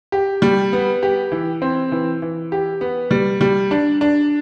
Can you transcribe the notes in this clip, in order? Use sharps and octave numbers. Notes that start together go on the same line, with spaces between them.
G4
G3
B3
G4
E3
C4
E3
E3
G4
B3
G3
G3
D4
D4